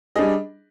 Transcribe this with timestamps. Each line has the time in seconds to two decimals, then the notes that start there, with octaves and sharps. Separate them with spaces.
0.16 G3 D4 G#4 D#5